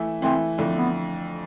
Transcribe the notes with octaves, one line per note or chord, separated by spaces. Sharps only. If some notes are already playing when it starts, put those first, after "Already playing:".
Already playing: E3 A3 E4
E3 A3 C4 E4
F2 D3 A3 E4
B3